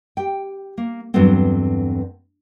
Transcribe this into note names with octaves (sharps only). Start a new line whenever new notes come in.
G4 G5
A#3
E2 G2 F#3 A3 B3 C4